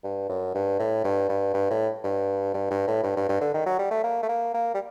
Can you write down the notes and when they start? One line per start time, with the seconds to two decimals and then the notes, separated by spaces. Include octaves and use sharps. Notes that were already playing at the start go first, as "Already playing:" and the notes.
0.04 G2
0.29 F#2
0.54 G2
0.79 A2
1.04 G2
1.29 G2
1.54 G2
1.70 A2
2.04 G2
2.54 G2
2.71 G2
2.87 A2
3.04 G2
3.16 G2
3.29 G2
3.41 D3
3.54 D#3
3.66 F#3
3.79 G3
3.91 A3
4.03 A#3
4.23 A3
4.29 A#3
4.54 A#3
4.74 G3